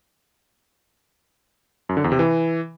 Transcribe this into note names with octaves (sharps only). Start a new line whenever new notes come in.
F#2
D3
E2
C3
E3